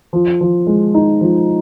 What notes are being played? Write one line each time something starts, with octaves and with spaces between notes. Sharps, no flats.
F3
F3
G#3
D#4
F3